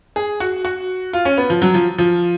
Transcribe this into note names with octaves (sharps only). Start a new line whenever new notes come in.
G#4
F#4
F#4
F4
C#4
B3
F3
F#3
F3
F3